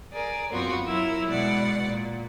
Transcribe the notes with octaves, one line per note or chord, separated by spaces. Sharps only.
G#4 A#4 D5
F#2 B3 C4 F4 F#4
F#3 E4 A#4 E6
B2 G#3 D5 F#5
A#2